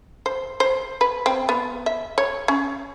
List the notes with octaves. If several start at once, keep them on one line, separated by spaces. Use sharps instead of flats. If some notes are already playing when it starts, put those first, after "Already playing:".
C5
C5
B4
C4
B3
E5
C#5
C#4